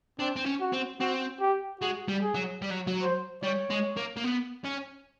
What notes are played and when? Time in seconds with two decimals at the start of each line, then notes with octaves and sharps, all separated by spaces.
0.19 C4 D4
0.36 C4
0.46 C#4
0.60 F#4
0.73 C4
1.00 C4 F#4
1.40 G4
1.81 G#3 F#4
2.08 G3
2.22 G#4
2.35 F#3
2.62 G3
2.71 F#3
2.87 F#3
3.02 C5
3.43 G3 C#5
3.70 G#3
3.96 A#3
4.17 A#3
4.24 B3
4.65 C#4